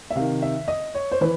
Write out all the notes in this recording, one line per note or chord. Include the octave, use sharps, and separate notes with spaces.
E5
C3 D#3 F5
E5
D#5
C#5
C5
E3 B4